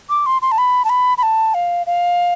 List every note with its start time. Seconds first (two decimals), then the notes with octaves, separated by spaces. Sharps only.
0.10 D6
0.26 C6
0.42 C6
0.52 A5
0.58 B5
0.85 A5
0.89 B5
1.18 B5
1.23 A5
1.54 F5
1.86 F5